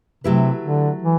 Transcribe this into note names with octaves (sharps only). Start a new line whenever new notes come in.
C3 F#3 A3 E4 G4 B4
D3
E3